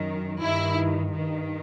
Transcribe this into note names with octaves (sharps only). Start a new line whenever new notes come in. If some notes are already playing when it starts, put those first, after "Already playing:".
Already playing: F#2 D#3
G2 D#3 E4
G2 D#3